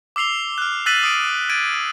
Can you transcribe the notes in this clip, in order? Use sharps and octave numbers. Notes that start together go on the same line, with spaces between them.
D6 E6 C7 F7 G7
F6 F#6
E6 F#6 A6 B6 D#7 F#7
D#6 D7
F#6 G#6 A6 D7 D#7